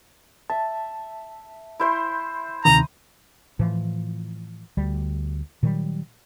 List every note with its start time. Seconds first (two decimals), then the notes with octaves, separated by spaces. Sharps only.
0.50 E5 A5
1.80 E4 C5 C6
2.65 D2 C3 D#3 A#5 D#6
3.59 A2 E3 F3
4.77 D2 G3
5.63 A#2 D#3 F#3 G3